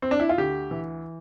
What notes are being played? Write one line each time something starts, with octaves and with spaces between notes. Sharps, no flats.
C4
D4
E4
F4
D2 G4
E3